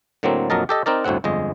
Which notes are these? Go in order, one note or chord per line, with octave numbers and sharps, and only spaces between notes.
A2 D3 F#3 A#3 C4
A#1 F2 F#3 A#4 D#5 A5
G4 A4 D#5
C4 D#4 A#4 D5
G1 D2 A2 C4 F#5
G1 F2 G#3 D#5